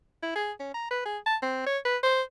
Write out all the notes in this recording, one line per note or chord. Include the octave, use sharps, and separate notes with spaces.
E4
G#4
C#4
A#5
B4
G#4
A5
C4
C#5
B4
C5